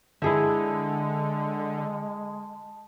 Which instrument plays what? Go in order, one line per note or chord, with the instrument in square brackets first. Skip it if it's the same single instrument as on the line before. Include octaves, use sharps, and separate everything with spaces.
[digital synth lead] D3 [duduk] G#3 [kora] E4 G#4 E5 [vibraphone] A5